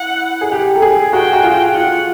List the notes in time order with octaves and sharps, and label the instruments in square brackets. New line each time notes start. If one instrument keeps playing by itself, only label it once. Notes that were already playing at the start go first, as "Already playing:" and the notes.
Already playing: [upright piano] E4 [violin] F#5
[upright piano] G#4
G4
A4
G#4
[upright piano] F#4 [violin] G5
[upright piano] F#4
F4
[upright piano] F4 [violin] F#5